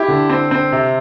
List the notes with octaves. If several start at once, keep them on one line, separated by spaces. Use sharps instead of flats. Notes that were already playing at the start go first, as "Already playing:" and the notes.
Already playing: E4 G4
D3
C4
C4
C3